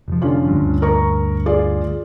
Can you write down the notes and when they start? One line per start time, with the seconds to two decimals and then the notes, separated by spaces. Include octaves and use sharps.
0.08 F1 F3
0.22 D3 C#4 F4
0.48 D2 G2
0.82 A#4 C#6
1.46 F4 G#4 D5